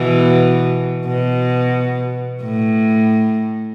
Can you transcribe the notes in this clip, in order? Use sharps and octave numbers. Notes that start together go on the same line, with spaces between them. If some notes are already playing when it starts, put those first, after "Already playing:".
Already playing: B2 E3
B2
A2